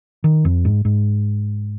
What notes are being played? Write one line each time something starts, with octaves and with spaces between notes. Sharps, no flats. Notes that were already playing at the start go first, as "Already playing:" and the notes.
D#3
F2
G#2
G#2